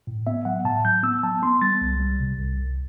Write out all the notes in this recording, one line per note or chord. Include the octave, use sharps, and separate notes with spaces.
A2
B3 E5
F#3 F#5
A2 A5
F#3 G6
B3 E6
F#3 A5
B3 C6
G3 A6
C2
G3
C3
C2
C2